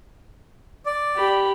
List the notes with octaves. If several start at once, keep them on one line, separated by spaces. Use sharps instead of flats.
D5
G4 B5